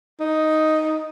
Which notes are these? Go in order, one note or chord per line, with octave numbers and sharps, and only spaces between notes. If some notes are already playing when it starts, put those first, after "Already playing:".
D#4